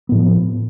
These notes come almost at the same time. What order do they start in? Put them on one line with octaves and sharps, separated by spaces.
B3 A2 F3